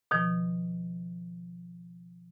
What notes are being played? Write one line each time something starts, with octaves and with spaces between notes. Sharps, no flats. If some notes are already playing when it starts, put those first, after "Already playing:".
B2 D#3 F3